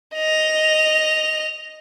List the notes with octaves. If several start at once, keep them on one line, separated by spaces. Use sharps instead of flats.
D#5 F7